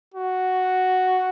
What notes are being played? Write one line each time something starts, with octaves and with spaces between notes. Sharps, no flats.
F#4